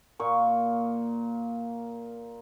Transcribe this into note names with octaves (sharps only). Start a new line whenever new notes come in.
A#2 A#3 C#6